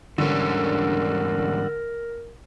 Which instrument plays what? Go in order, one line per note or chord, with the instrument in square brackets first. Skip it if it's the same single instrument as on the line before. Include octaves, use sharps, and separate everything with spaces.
[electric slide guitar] E2 G#2 C#4 [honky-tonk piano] D3 [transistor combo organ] G3 D4 F#5 [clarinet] A#4